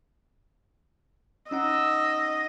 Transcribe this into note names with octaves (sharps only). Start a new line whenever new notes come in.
C#4 D#4 D#5 F#5 E6